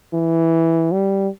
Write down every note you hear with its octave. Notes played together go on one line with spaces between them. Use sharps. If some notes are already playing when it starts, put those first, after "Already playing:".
E3
G3